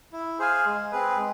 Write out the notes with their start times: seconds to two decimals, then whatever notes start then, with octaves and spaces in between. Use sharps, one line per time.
0.13 E4
0.39 G#4 C5 F5 G#5
0.66 G#3
0.92 C4 G#4 B4
1.17 G#3